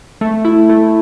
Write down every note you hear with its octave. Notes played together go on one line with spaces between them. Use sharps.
A3
E4
A3